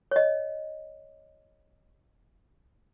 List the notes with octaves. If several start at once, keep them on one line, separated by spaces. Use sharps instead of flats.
C#5 D#5